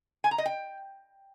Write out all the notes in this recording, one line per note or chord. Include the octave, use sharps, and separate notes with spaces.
G#5
A#5
D#5
G5